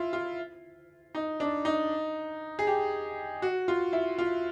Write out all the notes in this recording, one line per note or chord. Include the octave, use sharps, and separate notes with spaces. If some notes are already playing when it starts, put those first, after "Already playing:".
Already playing: E4 F4
F4
D#4
D4
D#4
G#4
G4
F#4
F4
E4
F4